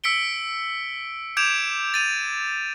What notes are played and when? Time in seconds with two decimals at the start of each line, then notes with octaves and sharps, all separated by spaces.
0.04 E6 B6 C#7 D7 G7
1.37 D6 G6 G#6 D7 E7 F7
1.94 A6 D#7 F7